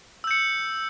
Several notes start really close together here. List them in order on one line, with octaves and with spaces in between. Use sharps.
E6 G6 C#7